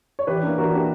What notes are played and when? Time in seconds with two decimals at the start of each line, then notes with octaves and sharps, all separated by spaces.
0.19 C#5
0.27 E3 G4 B4
0.43 A#3 D4
0.58 E3 F#4 A#4
0.73 A#3 D4 G4